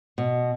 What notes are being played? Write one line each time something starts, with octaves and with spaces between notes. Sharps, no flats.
B2